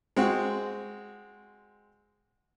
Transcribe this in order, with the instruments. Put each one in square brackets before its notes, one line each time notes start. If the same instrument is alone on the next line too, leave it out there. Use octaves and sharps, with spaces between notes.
[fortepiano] G#3 C4 F#4